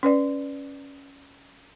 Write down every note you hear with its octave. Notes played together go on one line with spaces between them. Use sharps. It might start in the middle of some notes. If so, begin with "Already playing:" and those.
C#4 B4 D5